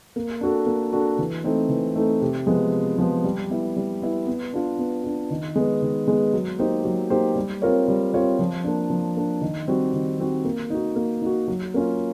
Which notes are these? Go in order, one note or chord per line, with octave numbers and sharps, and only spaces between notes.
A#3
D4 F#4 A4
A#3
D4 F#4 A4
E3
A3 C4 D#4
E3
A3 C4 D#4
C3
F3 G#3 B3
C3
F3 G#3 B3
G3
B3 E4
G3
B3 E4
B3
D4 F4
B3
D4 F4
D#3
G#3 B3
D#3
G#3 B3
F#3
A#3 D#4 G4 C5
F#3
A#3 D#4 G4 C5
G3
C4 F4 A#4 C#5
G3
C4 F4 A#4 C#5
F3
A#3 D4
F3
A#3 D4
D#3
G3 C4 D#4 F#4
D#3
G3 C4 D#4 F#4
A#3
D#4 F#4
A#3
D#4 F#4
F#3
A#3 C#4 F4